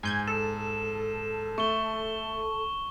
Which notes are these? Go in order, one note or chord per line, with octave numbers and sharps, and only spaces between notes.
G#2 G#5 G6 G#6
A4 E7
A3 C#6 G7